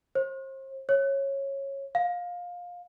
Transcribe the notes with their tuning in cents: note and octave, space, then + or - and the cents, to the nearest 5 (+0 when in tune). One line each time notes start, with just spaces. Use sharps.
C5 +35
C#5 -15
F5 +20